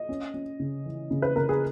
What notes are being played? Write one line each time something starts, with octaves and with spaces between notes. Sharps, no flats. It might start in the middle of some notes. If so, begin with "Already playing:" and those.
Already playing: D#5
C#4
C#4
C#3
E3
C#3
B4
C#3 A#4
G#4